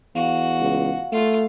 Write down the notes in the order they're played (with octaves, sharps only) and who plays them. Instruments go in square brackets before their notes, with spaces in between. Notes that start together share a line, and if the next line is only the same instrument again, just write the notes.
[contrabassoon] E2 [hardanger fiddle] F#4 [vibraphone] F5
[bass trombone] C#2
[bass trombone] A3 [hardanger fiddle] F4